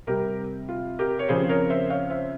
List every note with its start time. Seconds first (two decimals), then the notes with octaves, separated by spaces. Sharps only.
0.07 C3 G3 C4 G4 A#4
0.69 F4
0.99 G4 A#4
1.19 C#5
1.29 C#3 F3 C4 G#4 C5
1.49 A#4 C#5
1.70 C5 E5
1.90 C#5 F5
2.10 C5 E5